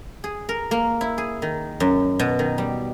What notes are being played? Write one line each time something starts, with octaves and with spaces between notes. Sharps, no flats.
G#4
A#4
A#3
E4
G#4
D#3
F#2
B2
D#3
G3